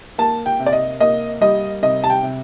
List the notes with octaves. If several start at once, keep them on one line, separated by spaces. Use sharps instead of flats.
A#3 A5
G5
C3
D5
D#5
A#3 D#5
G3 D#5
C3 D#5
A5
G5
C3